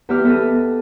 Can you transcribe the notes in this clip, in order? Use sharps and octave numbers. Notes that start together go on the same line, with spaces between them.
E2 B3 G4 E5 D6 F6
B3 A4 D#5